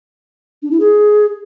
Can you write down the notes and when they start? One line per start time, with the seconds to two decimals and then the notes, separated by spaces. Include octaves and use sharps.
0.62 D4
0.71 E4
0.80 G#4